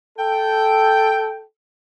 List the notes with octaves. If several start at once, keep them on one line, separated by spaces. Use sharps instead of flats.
A4 G5